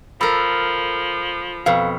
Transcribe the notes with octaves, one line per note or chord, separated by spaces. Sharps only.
F3 A4 A#4 B5
F2 B2 F5